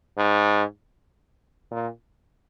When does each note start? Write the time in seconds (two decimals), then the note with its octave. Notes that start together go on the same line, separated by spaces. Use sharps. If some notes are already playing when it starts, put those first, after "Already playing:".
0.17 G#2
1.71 A#2